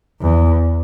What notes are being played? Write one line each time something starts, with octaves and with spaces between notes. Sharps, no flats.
E2